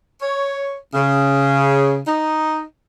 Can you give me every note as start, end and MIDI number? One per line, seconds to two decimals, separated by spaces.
0.21 0.75 73
0.93 1.98 49
2.07 2.62 63